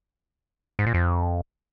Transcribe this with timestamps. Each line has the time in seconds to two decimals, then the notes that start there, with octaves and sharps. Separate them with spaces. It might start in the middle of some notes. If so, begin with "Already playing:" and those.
0.79 G#2
0.86 A#2
0.94 F2